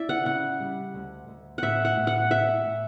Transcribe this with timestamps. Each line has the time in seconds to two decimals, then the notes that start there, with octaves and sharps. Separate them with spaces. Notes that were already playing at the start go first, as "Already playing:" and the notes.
Already playing: C#4 E4 D5 E5
0.09 F#5
0.25 C#3 F#5
0.60 G3
0.94 D2
1.28 D2
1.58 A2 E5 F#5
1.85 F#5
1.96 A2
2.07 F#5
2.31 A2 E5
2.65 A2